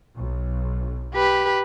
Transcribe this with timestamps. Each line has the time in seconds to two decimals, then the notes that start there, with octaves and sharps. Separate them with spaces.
0.15 B1
1.14 G4 B4